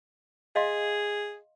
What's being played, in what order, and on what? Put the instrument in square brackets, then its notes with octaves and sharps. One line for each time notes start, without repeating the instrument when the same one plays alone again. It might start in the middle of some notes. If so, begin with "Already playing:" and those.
[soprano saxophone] G#4 [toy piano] D#5 F5 C6